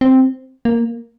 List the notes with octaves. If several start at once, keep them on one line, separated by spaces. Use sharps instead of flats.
C4
A#3